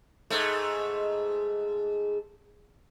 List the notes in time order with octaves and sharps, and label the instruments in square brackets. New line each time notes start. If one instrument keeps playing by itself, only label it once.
[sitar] G#2 A3